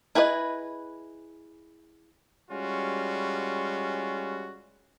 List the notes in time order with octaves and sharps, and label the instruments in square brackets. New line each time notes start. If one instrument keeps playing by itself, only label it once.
[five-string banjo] E4 G#4 B4 C#5 D#5
[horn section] G3 G#3 C#4 F4 F#4